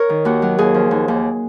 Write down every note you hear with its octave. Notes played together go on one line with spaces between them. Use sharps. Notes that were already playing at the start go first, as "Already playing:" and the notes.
Already playing: A#4 C#5
D#3
D#2 F#4
F#3
D#2 G#4
F3
D#2
D#2